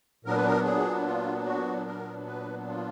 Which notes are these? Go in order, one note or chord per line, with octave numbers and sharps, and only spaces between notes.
A#2 F#3 B3 D4 A#4
B4
A#4
G#4
F4
F#4
A#4
B4
F4